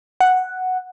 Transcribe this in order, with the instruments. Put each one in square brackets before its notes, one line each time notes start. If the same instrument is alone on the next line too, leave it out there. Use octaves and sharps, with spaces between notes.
[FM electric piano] F#5